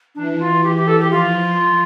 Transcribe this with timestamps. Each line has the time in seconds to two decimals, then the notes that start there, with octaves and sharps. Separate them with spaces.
0.15 E3 D4
0.40 F4
0.63 G4
0.76 G4
0.87 A4
0.99 G4
1.11 F3 F4